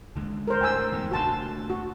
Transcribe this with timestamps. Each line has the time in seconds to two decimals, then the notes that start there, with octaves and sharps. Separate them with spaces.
0.16 D#2 D3 G#3
0.48 A#4 C5
0.61 D2 A2 G5 G#5 E6
0.92 E2 G#2
1.11 F1 D2 F#4 A5 C6
1.70 F#4